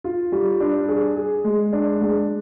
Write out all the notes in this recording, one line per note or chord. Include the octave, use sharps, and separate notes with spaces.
F4
G3
D4
G#4
G#4
G#3
D4
G#3